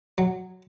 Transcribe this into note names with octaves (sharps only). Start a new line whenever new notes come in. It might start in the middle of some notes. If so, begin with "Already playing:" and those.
F#3